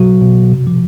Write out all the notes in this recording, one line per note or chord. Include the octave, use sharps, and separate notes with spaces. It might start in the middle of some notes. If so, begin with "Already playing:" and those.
Already playing: B2 F#3 F#4
B2
C3
F3